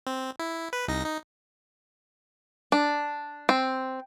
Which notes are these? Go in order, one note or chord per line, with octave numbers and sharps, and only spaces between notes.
C4
E4
B4
C2 D#4 A#6
D#4
D4
C4